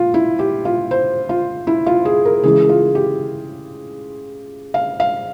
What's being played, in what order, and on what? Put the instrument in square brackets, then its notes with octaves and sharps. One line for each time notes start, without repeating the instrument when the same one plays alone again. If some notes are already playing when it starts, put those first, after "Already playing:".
Already playing: [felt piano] A#2 F3 F4
E4
G4
F4
C5
F4
E4
F4
G#4
A#4
C#3 E3 G#3 G#4
F4
G4
F5
F5